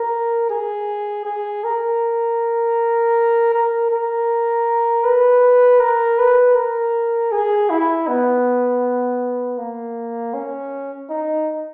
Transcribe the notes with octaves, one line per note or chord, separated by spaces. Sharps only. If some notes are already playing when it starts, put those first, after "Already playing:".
Already playing: A#4
G#4
G#4
A#4
A#4
A#4
B4
A#4
B4
A#4
G#4
E4
B3
A#3
C#4
D#4